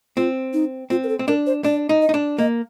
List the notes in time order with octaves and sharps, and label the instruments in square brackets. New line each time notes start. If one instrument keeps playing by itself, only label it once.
[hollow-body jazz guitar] C4 [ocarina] F4
[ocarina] D#4
[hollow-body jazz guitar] C4 [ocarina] F4
[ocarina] A#4
A4
[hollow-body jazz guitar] C4
[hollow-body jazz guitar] D4 [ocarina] A#4
[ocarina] C5
[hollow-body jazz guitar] D4 [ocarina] D5
[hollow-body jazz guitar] D#4
[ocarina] D#5
[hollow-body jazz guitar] D#4
D4
[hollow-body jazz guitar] A#3 [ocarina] D#5